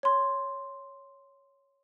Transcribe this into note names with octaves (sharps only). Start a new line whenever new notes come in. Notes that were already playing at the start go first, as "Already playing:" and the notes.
C#5 C6